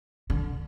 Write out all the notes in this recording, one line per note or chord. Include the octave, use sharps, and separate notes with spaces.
D3